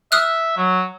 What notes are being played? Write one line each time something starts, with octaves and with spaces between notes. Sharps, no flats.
E5 D#6 F6 F#6
F#3